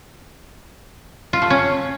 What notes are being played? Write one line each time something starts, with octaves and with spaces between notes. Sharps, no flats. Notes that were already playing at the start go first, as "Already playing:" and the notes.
F4
A3
C#4